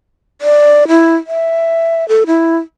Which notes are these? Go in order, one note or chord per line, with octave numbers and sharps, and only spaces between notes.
D5
E4
E5
A4
E4